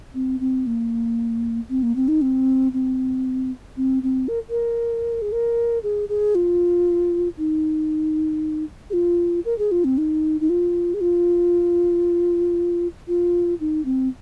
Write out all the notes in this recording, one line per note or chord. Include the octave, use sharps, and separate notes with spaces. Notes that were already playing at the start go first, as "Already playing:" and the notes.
C4
C4
A#3
C4
A#3
C4
D#4
C4
C4
C4
C4
A#4
A#4
G#4
A#4
G#4
G#4
F4
D#4
G#4
F4
A#4
G#4
F4
C4
D#4
D#4
F4
G#4
F4
F4
D#4
C4